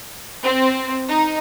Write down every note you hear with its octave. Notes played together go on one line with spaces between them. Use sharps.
C4
D#4